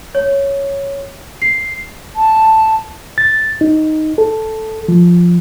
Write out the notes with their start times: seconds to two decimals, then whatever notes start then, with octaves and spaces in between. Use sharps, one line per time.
0.15 C#5
1.42 C7
2.16 A5
3.18 A6
3.61 D#4
4.18 A4
4.88 F3